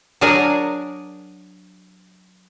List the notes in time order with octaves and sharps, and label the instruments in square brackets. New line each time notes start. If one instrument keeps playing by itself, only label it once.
[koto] F#3 D4 G#4 A#4 D5 G#5